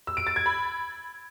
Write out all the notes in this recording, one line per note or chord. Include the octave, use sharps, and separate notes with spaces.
E6
D7
A6
G#6
B5